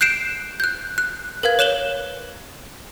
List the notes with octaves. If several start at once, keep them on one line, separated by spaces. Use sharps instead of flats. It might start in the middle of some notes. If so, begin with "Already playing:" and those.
F#6 G6 C7 D7 E7
F#6 G6
F#6
A#4 B4 F5 G#6
C#5 F#6 E7 F#7 G7